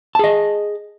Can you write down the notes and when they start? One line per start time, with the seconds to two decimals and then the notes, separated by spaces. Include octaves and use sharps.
0.15 A5
0.19 G#4
0.24 D#5